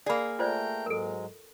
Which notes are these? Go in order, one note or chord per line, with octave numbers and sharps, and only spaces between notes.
A#3 G#4 D5 B5
A3 F4 C5 D5 G5 A#5
G#2 F#3 G#3 A4 A#4